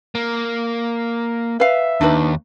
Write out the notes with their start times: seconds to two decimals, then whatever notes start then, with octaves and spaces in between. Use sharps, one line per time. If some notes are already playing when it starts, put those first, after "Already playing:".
0.15 A#3
1.60 B4 E5 F5
2.01 D#2 D4 D#4 B4